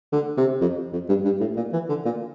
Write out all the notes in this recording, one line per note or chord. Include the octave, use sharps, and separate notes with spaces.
D3
C3
F2
F2
G2
G2
A2
A#2
E3
D3
A#2